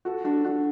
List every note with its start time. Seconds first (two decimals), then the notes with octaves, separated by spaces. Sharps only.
0.05 F#4 A4
0.24 D4 F#4
0.44 D4 F#4